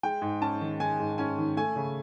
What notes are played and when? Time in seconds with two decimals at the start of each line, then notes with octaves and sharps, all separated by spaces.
0.03 G#3 G5
0.22 G#2
0.41 C#4 A5
0.61 D#3
0.80 G#3 G#5
0.99 G#2
1.18 C#4 G#5
1.38 D#3
1.57 A3 G#5
1.76 C#3